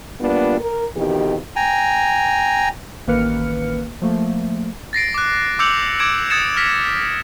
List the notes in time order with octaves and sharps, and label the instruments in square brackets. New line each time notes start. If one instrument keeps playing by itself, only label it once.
[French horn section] G3 A#3 B3 D4 F4
A#4
F2 B2 D#3 E3 G4
[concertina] G5 G#5 A#5
[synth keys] A1 D#3 A#3 B4 F6 C#7
F3 A3 A#3
[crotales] A6 A#6 C7 D7
D6 F#6
D6 E6 G6 C#7 F7 F#7
D6 G#6 D7 E7
D#6 G#6 A6 C#7 E7
F6 A#6 B6